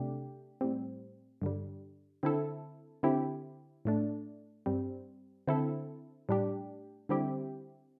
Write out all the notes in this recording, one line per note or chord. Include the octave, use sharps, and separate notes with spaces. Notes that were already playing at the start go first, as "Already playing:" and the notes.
Already playing: C3 A3 D4 G4
A2 G3 C4
G2 D3 G3
D3 C4 E4 A4
D3 C4 E4 G4
A2 A3 D4
G2 G3 C4
D3 C4 E4 A4
A2 G3 D4 G4
D3 G3 C4 E4 G4